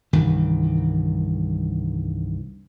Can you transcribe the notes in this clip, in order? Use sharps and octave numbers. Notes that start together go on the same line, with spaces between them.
C2 G2 D#3 E3